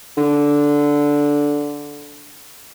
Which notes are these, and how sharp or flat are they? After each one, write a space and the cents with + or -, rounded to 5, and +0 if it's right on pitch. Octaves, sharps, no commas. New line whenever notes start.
D3 -10